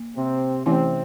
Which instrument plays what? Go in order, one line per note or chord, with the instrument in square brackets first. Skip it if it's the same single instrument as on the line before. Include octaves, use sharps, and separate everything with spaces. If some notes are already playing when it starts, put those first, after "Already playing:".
Already playing: [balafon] A#3
[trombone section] C3 C4
[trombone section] C3 C4 [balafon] E3 A3 C#4 E4